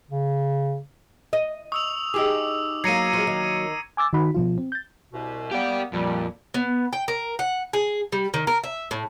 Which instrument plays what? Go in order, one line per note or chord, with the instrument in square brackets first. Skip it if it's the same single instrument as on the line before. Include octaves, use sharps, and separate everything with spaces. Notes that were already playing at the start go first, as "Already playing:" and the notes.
[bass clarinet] C#3
[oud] D#5
[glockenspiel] C#6 [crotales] D#6 E6 F7
[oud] D#4 G4 G#4 [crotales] D6 E6
[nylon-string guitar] F#3 A#3 [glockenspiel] A#5 A#6 C7 [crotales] G#6 C#7 D#7
[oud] F3 G#3
D#3
[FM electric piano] G#5 D6 E6 A6
D#3 D#4 F#4 B5
B2 F3 F4
C4
G6 A6
[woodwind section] C2 B2
[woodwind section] A#3 B3 [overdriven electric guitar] G4 D5
[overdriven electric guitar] F2 [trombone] A#2 [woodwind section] G3
[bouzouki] B3
G5
A#4
F#5
G#4
G3
D#3
A#4
E5
A2